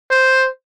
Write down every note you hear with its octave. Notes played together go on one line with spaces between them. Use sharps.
C5